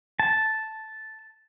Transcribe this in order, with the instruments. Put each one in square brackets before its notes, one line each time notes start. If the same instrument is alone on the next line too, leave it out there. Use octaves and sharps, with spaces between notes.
[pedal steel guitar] A5